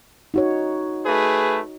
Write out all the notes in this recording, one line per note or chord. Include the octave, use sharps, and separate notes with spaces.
D#4 F#4 C#5
A3 G#4 B4